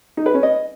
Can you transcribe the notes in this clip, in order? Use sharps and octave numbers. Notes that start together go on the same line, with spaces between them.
D#4
B4
C#4
D#5